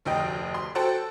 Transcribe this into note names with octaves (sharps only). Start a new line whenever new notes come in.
F1 D2 D#5 G5
C6
F#4 A4 C5 G5 A5